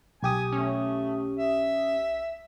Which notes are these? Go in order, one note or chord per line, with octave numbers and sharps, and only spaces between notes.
B1 G4 G#5 D#6
A3 C#4
E5